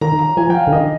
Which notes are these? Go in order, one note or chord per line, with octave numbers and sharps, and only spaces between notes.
D#3 A#5
A#5
F3 G#5
G5
F5
D3
D#3 D#5